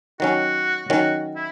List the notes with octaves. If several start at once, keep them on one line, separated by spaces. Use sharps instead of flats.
D#3 F#3 C#4 F#4
D#3 F#3 C#4 F#4
E4